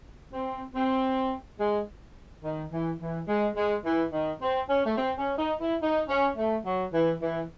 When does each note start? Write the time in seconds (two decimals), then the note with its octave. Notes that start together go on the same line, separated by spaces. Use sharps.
0.33 C4
0.74 C4
1.60 G#3
2.43 D#3
2.72 E3
3.00 E3
3.27 G#3
3.55 G#3
3.84 E3
4.11 D#3
4.41 C4
4.69 C#4
4.85 A3
4.96 C4
5.18 C#4
5.38 D#4
5.60 E4
5.81 D#4
6.08 C#4
6.37 A3
6.65 F#3
6.93 E3
7.21 E3